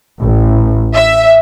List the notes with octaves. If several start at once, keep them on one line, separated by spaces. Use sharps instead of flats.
A1
E5